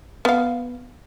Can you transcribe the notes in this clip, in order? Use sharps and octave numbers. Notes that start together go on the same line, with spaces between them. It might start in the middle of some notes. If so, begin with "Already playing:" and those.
B3 F5